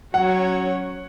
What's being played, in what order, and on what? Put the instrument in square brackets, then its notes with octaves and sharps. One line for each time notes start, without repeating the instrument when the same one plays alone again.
[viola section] F#3 C#4 F#4 C#5 [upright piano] F#5